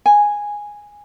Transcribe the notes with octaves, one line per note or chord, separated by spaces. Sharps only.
G#5